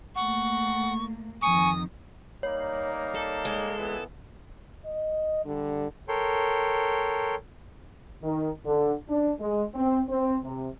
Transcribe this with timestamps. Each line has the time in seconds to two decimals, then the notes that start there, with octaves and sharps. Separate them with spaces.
0.16 A3 A#3 F#5 C#6
1.42 F2 D#3 G#5 C#6 D#6
2.43 G3 A#3 D#4 C#5
3.15 A4
3.45 G#3
3.77 A#2 E3 B3
4.85 D#5
5.45 D3 G3
6.08 A4 A#4 C#5 G5 C6
8.23 D#3
8.66 D3
9.09 D4
9.40 G#3
9.75 C4
10.08 C4
10.44 C3